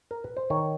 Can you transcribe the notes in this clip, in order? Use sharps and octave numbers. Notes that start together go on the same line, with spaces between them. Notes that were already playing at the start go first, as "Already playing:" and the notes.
A#4
B4
C5
D#3 C#5